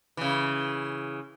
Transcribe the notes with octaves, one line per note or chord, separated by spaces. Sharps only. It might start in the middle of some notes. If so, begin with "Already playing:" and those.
C#3 E3